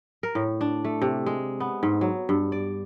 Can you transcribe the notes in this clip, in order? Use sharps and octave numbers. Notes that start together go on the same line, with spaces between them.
A#4
A2
D4
A3
C3
G#3
B3
G#2
F#3
G2
D5